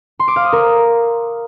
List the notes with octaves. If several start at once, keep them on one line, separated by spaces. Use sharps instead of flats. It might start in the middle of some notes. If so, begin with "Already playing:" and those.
C6
D6
F5
D#6
A#4